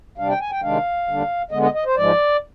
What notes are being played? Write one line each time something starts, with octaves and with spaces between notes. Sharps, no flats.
C3 G3 D4 F5
G5
G#5
G5
C3 D#3 G#3 D4 F5
D#2 D3 G3 D4
D3 G#3 B3 D#5
D#5
D#5
C5
G#2 F3 G#3 D5